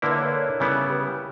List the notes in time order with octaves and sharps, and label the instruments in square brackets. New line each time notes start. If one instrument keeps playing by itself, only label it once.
[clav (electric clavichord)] D3 A#3 E4 [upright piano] B4 D5
[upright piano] C#5 E5
B4 D5
A#4 C#5
[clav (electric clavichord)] C#3 G3 B3 E4
[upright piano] G4 B4